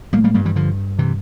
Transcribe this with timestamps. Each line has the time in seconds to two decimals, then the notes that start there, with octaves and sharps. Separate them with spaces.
0.13 A2 G3 A#3
0.24 G3 A#3
0.34 G2 G3 A#3
0.45 E3 G3
0.56 D3 F3
0.99 C3 E3